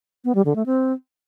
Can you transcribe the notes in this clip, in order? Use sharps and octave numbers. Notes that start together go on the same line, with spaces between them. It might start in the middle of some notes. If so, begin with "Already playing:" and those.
B3
G3
D3
A3
C4